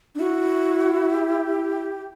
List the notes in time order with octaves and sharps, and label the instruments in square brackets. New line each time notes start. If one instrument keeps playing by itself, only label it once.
[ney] D4
[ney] E4 [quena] F#4
[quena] G4